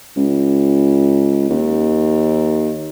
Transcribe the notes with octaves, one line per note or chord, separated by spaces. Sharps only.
C#2
D#2